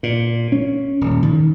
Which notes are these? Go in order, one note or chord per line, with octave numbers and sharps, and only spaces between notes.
A#2
C#4
D#1
D#3